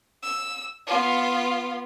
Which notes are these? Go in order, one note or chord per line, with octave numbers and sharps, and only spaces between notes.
E6
B3 F4